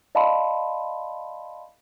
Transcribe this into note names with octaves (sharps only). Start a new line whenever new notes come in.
D5 D#5 F5 A5 B5 C6